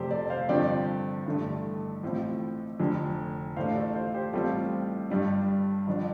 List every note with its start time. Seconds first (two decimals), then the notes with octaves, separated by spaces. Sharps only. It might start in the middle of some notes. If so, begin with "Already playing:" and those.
Already playing: F1 F2 C3 A3 G4 A4 C5 D5
0.11 A4 D5
0.30 C5 F5
0.49 G2 D3 F3 C4 D5 G5
1.26 A1 G2 D3 A3
2.03 A1 A2 F3 C4
2.80 F1 F2 D3
3.56 A1 A2 A3 D4 C5 F5
3.75 A4 D5
3.95 C5 F5
4.14 G4 C5
4.33 A1 A2 G3 C4 F4 A4
5.10 G1 G2 G3 D4
5.87 G1 F2 F3 D4